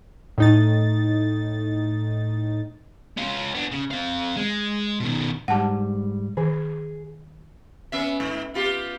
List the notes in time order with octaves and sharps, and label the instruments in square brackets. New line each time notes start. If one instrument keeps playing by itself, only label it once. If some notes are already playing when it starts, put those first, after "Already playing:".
[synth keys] A2 D#4 A6
[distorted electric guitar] C#4 F4
B3 D4
C#3
C4 F5
G#3
B2 D#3
[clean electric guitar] G#2 G3 [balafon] F#5 A5
[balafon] D#3 [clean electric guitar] G#4
[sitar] B3 C#4 E5
G#2
B3 F4 G4